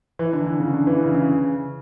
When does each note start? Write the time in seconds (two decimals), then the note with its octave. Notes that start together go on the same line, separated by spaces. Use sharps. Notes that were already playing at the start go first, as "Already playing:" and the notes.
0.19 E3
0.33 D3
0.46 D3
0.60 C#3
0.74 D3
0.87 E3
1.01 C#3
1.15 C#3